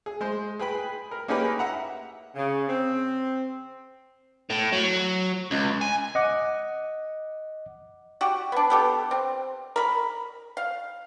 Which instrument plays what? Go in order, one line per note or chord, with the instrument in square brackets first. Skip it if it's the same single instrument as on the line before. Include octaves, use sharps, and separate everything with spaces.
[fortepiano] G#4
G#3 C5
G#4 B4 G5 B5
A#4
A#3 C#4 D#4 G4 G#4 B4
E5 F#5 A#5
[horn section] C#3
C4
[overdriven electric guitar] A2
F#3
C#2
G#5
[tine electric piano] D#5 F#5 D6
[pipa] F#4 G4
B3 D4
B3 G4 A4
C4
A#4 B5
F5